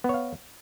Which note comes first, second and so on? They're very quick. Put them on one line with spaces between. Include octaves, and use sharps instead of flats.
B3 C#5 F5